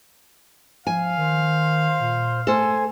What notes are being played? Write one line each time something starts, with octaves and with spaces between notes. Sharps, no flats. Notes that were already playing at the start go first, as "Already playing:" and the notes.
F3 F5 G#5
D#3 C5
A#2
A3 A4 C5 G#5